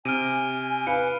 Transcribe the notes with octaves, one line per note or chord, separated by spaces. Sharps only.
C3 G#5 F6 D7 D#7
B4 F5 C#7